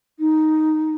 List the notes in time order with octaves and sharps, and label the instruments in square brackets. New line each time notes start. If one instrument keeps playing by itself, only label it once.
[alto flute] D#4